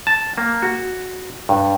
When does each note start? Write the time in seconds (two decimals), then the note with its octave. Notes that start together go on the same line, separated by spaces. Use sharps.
0.07 A5
0.38 A#3
0.62 F#4
1.49 G2